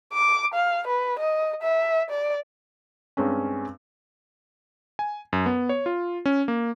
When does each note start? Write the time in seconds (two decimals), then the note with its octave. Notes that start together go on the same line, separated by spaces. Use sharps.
0.13 D6
0.54 F5
0.87 B4
1.19 D#5
1.62 E5
2.09 D5
3.17 G2 G#3 C4 C#4
4.99 G#5
5.33 F#2
5.46 B3
5.69 C#5
5.86 F4
6.26 C#4
6.48 A#3